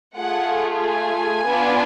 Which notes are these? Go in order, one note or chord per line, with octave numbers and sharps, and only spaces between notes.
A3 F4 G#4 F#5
G#5
B3 D4 F4